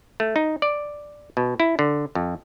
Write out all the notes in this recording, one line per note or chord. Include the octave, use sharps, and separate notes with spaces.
A3
D#4
D5
B2
E4
D3
F2